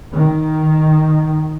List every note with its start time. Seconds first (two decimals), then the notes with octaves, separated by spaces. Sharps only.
0.13 D#3